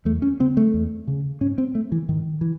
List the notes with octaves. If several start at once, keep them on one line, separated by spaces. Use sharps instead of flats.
E2 A3
C#4
C#3 C4
A3
E2
C#3
G#2 C#4
C4
A3
E3
G#2 D#3
E3